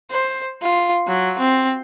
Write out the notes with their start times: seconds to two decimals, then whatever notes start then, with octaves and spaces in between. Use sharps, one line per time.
0.10 C5
0.62 F4
1.07 F#3
1.39 C4